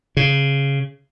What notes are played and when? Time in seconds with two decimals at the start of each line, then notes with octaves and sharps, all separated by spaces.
0.17 C#3